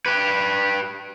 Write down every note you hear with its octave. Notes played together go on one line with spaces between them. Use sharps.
G4 B4